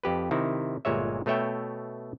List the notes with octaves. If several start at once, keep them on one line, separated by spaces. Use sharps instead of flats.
F2 G4 B4
C3 D#3 E4
G1 A#2 G#3 C#5 E5
B2 A3 C#5 E5 G5